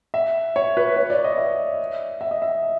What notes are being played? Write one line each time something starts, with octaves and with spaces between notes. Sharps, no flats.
E5
C#5
B4
C#5
D5
D#5
E5
E5
D#5
E5